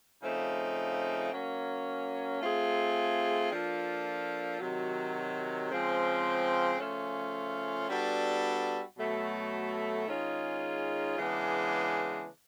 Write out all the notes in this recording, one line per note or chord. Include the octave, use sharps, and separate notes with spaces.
C#3 F3 A3 C4 D#4
F#3 A#3 C#4
A3 C4 F4 G#4
F3 A#3 D4 F4 A4
C3 D#3 F#3
C#3 F3 G#3 C4
C#3 F3 A3 C#4 F4
G3 B3 D4 F#4 A4
B2 F#3 A3
D#3 G#3 C#4 F4 G#4
C#3 E3 G#3 B3 D4